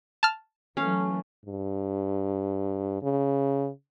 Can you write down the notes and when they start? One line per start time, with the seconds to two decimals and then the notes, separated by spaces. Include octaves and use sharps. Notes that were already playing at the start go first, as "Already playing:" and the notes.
0.23 A5 F6
0.77 E3 F#3 A3 C#4 F5
1.45 G2
3.02 C#3